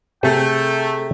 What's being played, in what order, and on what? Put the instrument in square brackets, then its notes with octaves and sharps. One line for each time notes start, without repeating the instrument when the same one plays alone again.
[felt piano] C3 [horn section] A3 [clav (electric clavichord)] G#4 A4 [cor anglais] G5